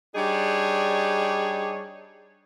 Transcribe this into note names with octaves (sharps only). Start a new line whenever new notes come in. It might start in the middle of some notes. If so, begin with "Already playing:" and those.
G3 D4 D#4 G#4 C#5 D5